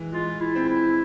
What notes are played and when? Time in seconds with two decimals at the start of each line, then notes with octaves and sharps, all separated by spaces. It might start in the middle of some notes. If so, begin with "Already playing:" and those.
Already playing: E3 G#3
0.12 G#3 F4
0.40 E4
0.55 C4
0.69 E4